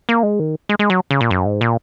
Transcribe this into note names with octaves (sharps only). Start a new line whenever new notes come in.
A#3
G#3
D#3
G#3
G#3
F#3
C#3
A#2
F#2
G#2
A#2